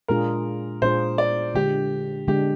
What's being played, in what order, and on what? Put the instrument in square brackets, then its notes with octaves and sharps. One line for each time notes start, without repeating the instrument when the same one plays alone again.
[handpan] A#2 G#3 D4 F4 G#4 [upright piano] A#4
[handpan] A#2 G#3 D4 F4 G#4 [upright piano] C5
[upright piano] D5
[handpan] D3 G#3 D4 [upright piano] G4
[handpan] D3 G#3 D4 [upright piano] G4